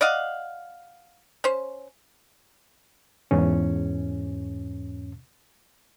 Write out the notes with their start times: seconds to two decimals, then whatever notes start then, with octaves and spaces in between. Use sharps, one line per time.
0.01 D5 D#5 F5 F#5
1.44 C#4 C5
3.31 E2 G#2 C#4